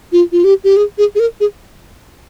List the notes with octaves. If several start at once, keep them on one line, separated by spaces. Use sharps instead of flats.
F4
F4
G4
G4
G#4
G#4
G#4
A#4
G#4